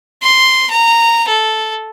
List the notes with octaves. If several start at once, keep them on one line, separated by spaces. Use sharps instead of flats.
C6
A#5
A4